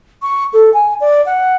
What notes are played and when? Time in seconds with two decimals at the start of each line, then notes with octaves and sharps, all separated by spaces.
0.22 C#6
0.53 A4
0.74 G#5
1.01 D5
1.26 F#5